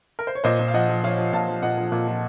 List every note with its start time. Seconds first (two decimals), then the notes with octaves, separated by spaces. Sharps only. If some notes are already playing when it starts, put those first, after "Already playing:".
0.19 A#4
0.27 C5
0.35 C#5
0.44 A#2 C5 D#5
0.59 A#2
0.68 F5
0.74 F3 D#5 F#5
0.89 F3
1.04 F3 C#5 F5
1.18 F3
1.33 A#2 F5 A5
1.48 F3
1.63 A#2 D#5 F#5
1.78 F3
1.92 A#2
2.07 F3